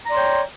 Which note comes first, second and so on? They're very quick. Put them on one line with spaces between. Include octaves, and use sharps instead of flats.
A#5 D5 C6 C#5 G5